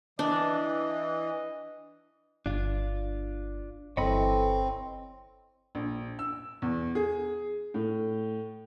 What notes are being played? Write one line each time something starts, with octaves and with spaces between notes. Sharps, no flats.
E3 D4 D#5
G1 D4 F4
G1 E3 C4 A4 C#5 D#5 B5
A#1
E6
E2
G#4
A2